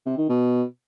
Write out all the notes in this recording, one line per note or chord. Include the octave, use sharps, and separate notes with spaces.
C3
D#3
B2